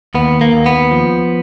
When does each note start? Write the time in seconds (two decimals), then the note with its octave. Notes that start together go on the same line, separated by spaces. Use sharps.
0.14 D#2 B3
0.41 A#3
0.53 D#2
0.66 B3
0.91 F3